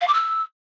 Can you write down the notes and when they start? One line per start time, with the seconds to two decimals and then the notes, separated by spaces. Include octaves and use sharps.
0.01 F5
0.07 D6
0.13 E6